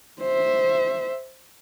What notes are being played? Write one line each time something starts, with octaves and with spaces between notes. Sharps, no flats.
C5 E5